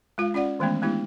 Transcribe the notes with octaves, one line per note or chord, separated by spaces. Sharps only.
G#3 F4 F5
C#4 F4 D5 F#5
D#3 E3 G#3 A3 B3 C#4
G#3 A3 B3 D4 E4 G4